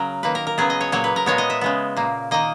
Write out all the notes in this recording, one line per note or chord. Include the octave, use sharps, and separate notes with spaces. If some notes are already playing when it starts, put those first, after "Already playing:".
Already playing: C#3 F#3 A#4
D#3 A#3 B4
A#4
A#4
C#3 F#3 B3 G#4
D#5
C#5
A#2 F#3 A#3 C#5
B4
A#4
A#2 G#3 B3 C#5
D#5
E5
C#3 G#3 B3
A#2 A#3
D#3 A#3 D#5